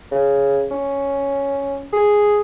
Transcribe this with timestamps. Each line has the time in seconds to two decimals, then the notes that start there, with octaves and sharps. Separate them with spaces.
0.12 C#3
0.71 C#4
1.93 G#4